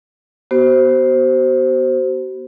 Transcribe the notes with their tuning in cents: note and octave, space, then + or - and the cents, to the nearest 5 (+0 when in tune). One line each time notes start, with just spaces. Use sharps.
B3 +0 F#4 +45 C5 +0